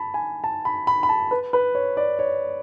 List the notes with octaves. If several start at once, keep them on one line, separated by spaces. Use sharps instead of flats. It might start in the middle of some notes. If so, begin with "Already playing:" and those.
Already playing: A5 B5
G#5
A5
B5
B5
B5
A5
B4
B4
C#5
D5
C#5